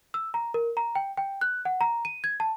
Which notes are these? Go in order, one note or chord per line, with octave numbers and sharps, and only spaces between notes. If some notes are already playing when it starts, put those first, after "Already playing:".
E6
A#5
A#4
A#5
G5
G5
F#6
F#5
A#5
D#7
G#6
A5